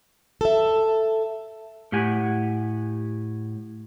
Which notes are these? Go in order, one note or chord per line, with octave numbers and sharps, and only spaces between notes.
A4 E5
A2 G4 F#5 G#5